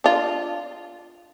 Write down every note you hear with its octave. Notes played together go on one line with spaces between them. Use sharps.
D4 F4